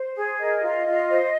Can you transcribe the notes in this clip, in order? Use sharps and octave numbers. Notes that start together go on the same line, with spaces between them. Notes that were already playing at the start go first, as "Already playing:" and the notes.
Already playing: C5
G#4
A#4 D#5
F4
F4
C5